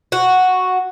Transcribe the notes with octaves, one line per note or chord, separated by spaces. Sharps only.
F#4